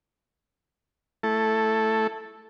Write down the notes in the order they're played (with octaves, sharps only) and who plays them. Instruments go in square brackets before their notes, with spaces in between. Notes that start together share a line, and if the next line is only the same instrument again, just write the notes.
[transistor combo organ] A3 E4 A4